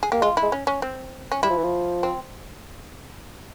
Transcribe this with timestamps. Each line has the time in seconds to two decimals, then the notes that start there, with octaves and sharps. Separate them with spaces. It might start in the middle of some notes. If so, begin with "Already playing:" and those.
0.03 G#4
0.12 A#3 G4
0.22 G#3 F4
0.37 E4
0.43 G#3
0.52 C#4
0.67 C#4
0.82 C4
1.32 C#4
1.43 G3 E4
1.50 F3
1.57 E3
1.64 F3
2.03 C4